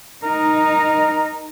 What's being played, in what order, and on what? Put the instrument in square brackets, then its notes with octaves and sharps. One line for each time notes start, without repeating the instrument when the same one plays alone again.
[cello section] D#4 [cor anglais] A#4